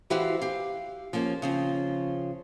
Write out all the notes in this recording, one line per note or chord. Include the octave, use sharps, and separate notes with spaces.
E3 E4 F#4 G4 C5 F5
G4 F5
F3 A#3 C#4
C#3 F3 C4